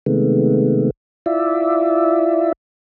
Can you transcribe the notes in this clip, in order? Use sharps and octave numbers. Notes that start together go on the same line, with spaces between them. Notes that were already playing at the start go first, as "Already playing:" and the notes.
C3 D#3 G#3 A3 B3
E4 F4 D5 E5